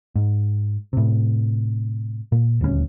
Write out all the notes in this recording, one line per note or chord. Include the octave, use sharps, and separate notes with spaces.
G#2
A2 C3
A#2
D#1 D2 G3 C#4